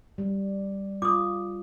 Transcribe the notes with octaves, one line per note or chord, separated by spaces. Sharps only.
G3
F4 D6 D#6